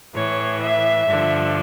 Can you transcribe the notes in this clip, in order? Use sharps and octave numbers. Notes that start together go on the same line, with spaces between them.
A2 E3 C#5
E5
G2 D3 F3